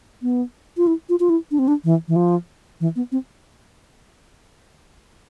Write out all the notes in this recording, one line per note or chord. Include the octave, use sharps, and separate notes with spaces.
B3
F4
E4
F4
F4
E4
D4
C4
D4
E3
E3
F3
E3
B3
C4